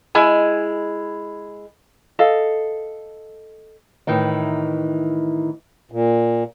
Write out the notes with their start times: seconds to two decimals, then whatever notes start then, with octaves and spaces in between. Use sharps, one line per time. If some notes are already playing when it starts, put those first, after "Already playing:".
0.15 G#3 E4 G#5
2.19 A4 D#5 F5
4.07 A2 D#3 E3 D#4
5.92 A#2